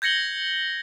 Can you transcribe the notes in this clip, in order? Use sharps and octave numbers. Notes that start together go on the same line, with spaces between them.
G6 G#6 A#6 C#7 F#7 G7